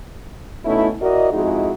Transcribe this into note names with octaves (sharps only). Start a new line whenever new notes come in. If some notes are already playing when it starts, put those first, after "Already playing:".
B2 A3 C#4 D#4 E4
E4 F#4 A#4 D5 D#5
F2 G#3 D#4 E4 F#4 G#4